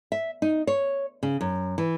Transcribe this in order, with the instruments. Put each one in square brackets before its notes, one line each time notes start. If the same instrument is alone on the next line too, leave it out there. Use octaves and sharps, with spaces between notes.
[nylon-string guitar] E5
D#4
C#5
C#3
F#2
E3